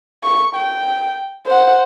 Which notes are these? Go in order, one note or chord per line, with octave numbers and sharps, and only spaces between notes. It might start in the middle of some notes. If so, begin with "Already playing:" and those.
C#6
G5
C5 F#5